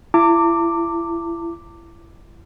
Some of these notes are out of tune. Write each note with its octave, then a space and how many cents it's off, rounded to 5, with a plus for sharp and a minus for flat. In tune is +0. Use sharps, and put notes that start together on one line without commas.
E4 +35 A#5 -45 D6 +0